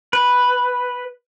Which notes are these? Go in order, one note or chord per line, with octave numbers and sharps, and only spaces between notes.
B4